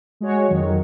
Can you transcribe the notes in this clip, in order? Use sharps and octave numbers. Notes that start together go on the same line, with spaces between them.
G#3 F#4 C#5
F2 D#3 F#3